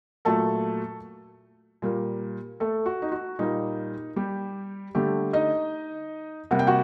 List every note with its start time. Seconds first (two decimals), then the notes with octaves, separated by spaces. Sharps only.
0.25 A#2 F#3 A3 A4 A5
1.82 A#2 G3 A#3
2.60 A3 A4
2.86 F#4
3.02 D#4
3.12 F#4
3.39 A#2 G3 A#3 D#4
4.16 G3 G4
4.95 D3 G3 A3 G4
5.33 D#4 D#5
6.51 C3 G3 A#3 F#5
6.59 G5
6.67 F#4 F#5